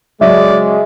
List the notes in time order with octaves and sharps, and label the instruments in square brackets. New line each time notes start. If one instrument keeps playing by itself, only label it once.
[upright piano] C#3 F#3 C#4 [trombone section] G#3 [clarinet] D5 [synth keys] E5